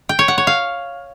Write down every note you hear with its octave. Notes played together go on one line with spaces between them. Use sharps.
G5
C#5
F#5
C#5
F5